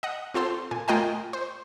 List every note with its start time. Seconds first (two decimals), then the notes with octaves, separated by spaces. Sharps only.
0.03 D#5 F#5
0.34 C4 F4 A4 C5
0.71 A#2 G#5
0.88 A3 F4 A#4 D#5 G5 G#5
1.33 C5